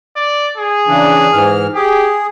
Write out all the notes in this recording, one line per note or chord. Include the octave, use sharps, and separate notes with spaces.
D5
G#4
C#3 E3 D4
G#2 E3 F6
G4 G#4